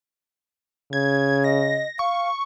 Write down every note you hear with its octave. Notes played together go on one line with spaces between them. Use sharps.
C#3 G#6
D#5 A#6
F5 C#6